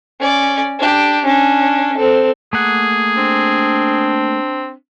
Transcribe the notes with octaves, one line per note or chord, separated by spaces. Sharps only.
C#4 D5
D4 G4
C#4 D4
C4 A4
A3 A#3 G#4 F#5
C4 D4